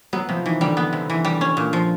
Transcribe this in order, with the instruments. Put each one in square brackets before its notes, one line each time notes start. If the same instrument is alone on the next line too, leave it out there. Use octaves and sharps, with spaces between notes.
[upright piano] F#3 [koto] B3
[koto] C3 [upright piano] F3
[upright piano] D#3 [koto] E3
[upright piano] D3 [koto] G3
[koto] B3
C3
E3
G3
C#4
A#2
F3